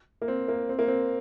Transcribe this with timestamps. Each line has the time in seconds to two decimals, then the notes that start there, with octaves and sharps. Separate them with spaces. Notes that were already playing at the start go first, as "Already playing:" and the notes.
0.22 A#3
0.28 C4
0.48 A#3
0.69 C4
0.79 A#3
0.88 C4